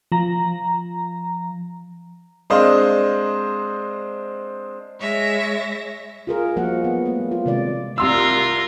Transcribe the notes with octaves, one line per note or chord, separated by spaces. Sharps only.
F3 A#5
G#3 C4 D4 C5 D#5 F5
G#3 C#5 E5 A#6
F4 G#4 A#4
F3 G3 A#3 F#4 F#5
F#3 B3
A3 A#3
F4
C3 D#3 G#3 D5
C2 F4 A#4 C6 E6